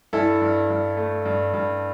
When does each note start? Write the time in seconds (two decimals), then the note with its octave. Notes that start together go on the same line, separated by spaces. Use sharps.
0.13 G2 E4 A4
0.41 G2
0.70 G2
0.97 A3
1.26 G2
1.54 G2